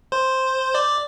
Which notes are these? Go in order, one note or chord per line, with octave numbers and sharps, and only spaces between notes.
C5 C6
D5 D6